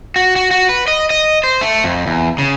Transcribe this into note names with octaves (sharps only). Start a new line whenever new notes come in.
F#4
F#4
F#4
B4
D#5
D#5
C5
A3
F2
E2
C#3